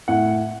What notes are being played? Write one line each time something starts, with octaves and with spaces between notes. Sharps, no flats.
A2 F#5